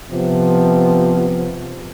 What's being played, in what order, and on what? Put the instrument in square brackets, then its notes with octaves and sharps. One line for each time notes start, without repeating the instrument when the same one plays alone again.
[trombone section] C3 F3 B3